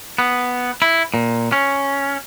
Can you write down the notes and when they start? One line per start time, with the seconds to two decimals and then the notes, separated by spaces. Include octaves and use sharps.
0.18 B3
0.82 E4
1.14 A#2
1.52 C#4